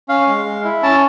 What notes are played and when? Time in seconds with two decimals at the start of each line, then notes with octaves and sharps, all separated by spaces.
0.09 C#4 F5
0.27 G#3
0.45 G#3
0.64 E4
0.82 C#4 A5